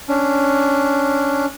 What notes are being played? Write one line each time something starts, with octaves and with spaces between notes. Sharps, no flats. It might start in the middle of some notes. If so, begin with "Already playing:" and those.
C#4 D4